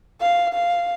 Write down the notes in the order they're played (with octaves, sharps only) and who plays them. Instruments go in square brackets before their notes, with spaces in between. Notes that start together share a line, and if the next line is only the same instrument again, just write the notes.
[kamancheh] F5
F5